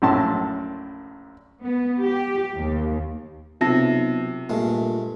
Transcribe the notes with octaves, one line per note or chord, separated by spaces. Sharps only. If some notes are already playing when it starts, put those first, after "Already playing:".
A#1 F#2 A2 A5 C6
B3
G4
D#2
B1 C3 F4 A5 A#6
G2 A#2 G#3 A3